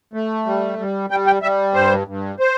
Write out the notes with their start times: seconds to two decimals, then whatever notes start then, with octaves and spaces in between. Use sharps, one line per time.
0.13 A3
0.46 G3
0.79 G3
1.10 G3 G5
1.26 G5
1.42 G3 E5
1.74 G2 C5
2.07 G2
2.40 C5